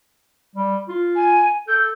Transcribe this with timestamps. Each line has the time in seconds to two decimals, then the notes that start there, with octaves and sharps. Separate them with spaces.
0.56 G3
0.89 F4
1.16 G#5
1.68 A4 G6